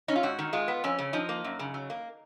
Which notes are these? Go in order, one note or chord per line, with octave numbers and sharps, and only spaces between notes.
C#4 D#4
F4
G#2 F#4
D#3
G#3 F4
B3
F2 C#4
C#3
F3 D#4
A#3
F#2
C#3
F#3
A#3